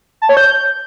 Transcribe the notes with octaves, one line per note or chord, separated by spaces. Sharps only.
A5
C#5
G6